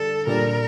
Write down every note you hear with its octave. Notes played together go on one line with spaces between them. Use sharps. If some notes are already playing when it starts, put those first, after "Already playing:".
Already playing: D3 G3 D4 A4
A#2 G3 D4 A#4